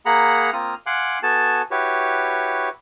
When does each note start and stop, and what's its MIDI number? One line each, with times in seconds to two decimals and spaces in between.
0.06 0.51 58
0.06 0.51 68
0.06 0.51 78
0.06 0.51 82
0.06 0.51 83
0.53 0.75 58
0.53 0.75 60
0.53 0.75 65
0.53 0.75 70
0.53 0.75 87
0.53 0.75 89
0.86 1.19 77
0.86 1.19 78
0.86 1.19 80
0.86 1.19 84
0.86 1.19 86
0.86 1.19 90
1.23 1.62 59
1.23 1.62 66
1.23 1.62 69
1.23 1.62 80
1.23 1.62 81
1.71 2.69 64
1.71 2.69 66
1.71 2.69 67
1.71 2.69 71
1.71 2.69 73